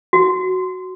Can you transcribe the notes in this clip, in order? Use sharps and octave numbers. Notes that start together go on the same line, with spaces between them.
F#4